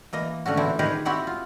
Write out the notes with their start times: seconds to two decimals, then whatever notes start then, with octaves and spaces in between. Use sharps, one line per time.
0.13 E3 A#3 D#5
0.46 D3 A3 C#4 F#4
0.57 A#2 E3 C4 D4 E4
0.79 D#3 D#4 G4 G#4 A#4 B4
1.05 C4 E4 F#4 G4 F#5
1.27 F4